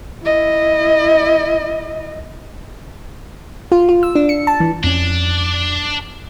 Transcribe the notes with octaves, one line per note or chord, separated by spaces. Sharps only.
E4 D#5
F4
F4
E6
D4
C#7
A5
E3
F2 C#4 D4